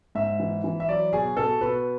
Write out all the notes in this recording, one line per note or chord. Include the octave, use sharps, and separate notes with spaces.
G#2 E5
E3
E3
E5
F#3 D5
B2 G#4
B2 A4
B2 B4